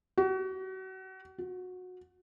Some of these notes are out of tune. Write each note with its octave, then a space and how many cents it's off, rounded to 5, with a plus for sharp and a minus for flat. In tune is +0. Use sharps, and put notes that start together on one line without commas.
F#4 +35
F#4 -20